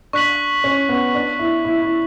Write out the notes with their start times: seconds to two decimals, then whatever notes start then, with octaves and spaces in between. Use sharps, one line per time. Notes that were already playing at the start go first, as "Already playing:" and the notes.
0.13 D4 C#6 F#6 B6 F#7
0.64 C#4
0.89 B3
1.15 D4
1.39 E4
1.65 E4
1.81 E4